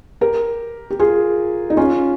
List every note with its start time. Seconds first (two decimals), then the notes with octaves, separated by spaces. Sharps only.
0.21 G4 A#4
0.90 G4
0.99 F4 G#4
1.70 D#4
1.77 C#4 F4